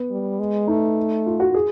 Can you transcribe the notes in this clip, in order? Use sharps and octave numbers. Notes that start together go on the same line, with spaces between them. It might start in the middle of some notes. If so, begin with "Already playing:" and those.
Already playing: B3
G3
G#3
A3 D#4
F4
F#4
G#4